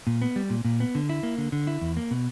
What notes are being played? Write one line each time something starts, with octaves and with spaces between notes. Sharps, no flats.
A#2
B3
G3
A#2
A#2
B3
D3
E4
A#3
D3
D3
E4
E2
A#3
B2